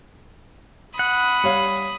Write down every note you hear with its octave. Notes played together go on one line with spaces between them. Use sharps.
F#5 B5 D#6
G3 C#5 F5